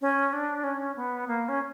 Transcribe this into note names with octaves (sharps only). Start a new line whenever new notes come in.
C#4
D4
C#4
B3
A#3
C#4